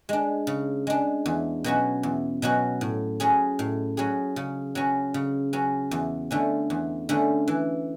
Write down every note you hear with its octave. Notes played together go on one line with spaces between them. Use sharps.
G#3 D4
C#3
G#3 D4
E2
B2 F#3 C#4 F#4
E2
B2 F#3 C#4 F#4
A2
F#3 C#4 G#4
A2
F#3 C#4 G#4
C#3
F#3 C#4
C#3
F#3 C#4
E2
D3 A3 C#4
E2
D3 A3 C#4
E3